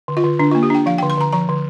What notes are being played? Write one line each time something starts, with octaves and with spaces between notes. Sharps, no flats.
D3
F4
D3
D3 D4
F4
A#3
G4
D4 G5
F3 F5
G5
D3
C6
D3 A#5
F3 A#5
D3